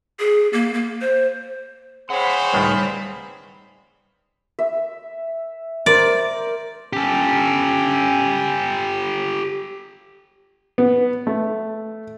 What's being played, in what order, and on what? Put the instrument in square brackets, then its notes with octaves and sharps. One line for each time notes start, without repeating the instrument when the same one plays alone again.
[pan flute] G#4
A#3
A#3
C5
[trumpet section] C4 G#4 B5 [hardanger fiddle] C5 C#5 [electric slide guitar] F5 F#5
[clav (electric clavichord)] C#2 A2 D#3 [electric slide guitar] G3
[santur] E5
[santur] A#4 C5 [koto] D5
[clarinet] C#4 [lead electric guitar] G4 A4
[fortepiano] B3
A3